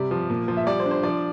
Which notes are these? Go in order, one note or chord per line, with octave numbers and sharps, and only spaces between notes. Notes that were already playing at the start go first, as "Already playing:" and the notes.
Already playing: C3 G3 D5
F3
A#2
F3
E5
G3 D5
C5
D4
C5
F3 D5